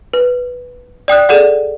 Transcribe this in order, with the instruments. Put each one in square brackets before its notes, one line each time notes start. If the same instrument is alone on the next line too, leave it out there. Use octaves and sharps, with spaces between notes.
[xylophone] B4
D5 G5 D#6 F#6
G#4 A4 D5 F#5